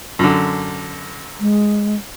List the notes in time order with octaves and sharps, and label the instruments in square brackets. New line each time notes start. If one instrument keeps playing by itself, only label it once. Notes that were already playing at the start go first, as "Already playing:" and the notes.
[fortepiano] F#2 D3
[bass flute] G#3